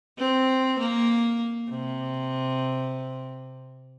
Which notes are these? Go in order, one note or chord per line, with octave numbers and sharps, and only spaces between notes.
C4
A#3
C3